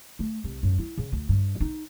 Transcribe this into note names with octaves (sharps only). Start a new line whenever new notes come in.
A3
C2
F#2
E4
C#3
D2
G2
D#4